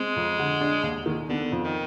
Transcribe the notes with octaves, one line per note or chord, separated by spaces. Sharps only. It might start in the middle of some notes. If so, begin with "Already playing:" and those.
Already playing: G#3 C4
F2
D3
D4
D#2
D#3
D3 B3
F2
D#3